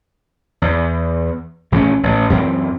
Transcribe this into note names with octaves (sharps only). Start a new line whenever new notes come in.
E2
A#1 E3 A3 C#4
A1
F#2 E3 C4